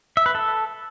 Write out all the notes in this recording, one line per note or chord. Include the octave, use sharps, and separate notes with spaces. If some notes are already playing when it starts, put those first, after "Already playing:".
E5
B4
A4